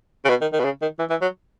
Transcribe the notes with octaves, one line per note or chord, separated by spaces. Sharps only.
C#3
B2
D#3
D#3
B2
C#3
D#3
E3
E3
F#3